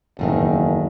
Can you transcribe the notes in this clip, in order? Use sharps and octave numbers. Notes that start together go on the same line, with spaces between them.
F#1 E2 A2 D#3